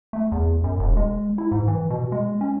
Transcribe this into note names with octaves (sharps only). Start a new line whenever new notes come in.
A3
E2
F#2
E1
G#3
E4
G#2
E3
B2
G#3
C#4